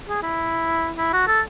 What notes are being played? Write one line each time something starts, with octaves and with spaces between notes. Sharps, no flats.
G#4
E4
E4
F#4
A4